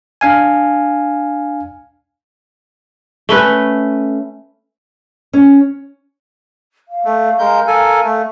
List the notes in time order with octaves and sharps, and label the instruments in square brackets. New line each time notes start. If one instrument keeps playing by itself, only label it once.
[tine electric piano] D4 F5 G#5
[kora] A3 C#4 B4
[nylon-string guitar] C#4
[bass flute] F5
[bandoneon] A3
G#3 A#4 G6
A4 A#4 G#5
A3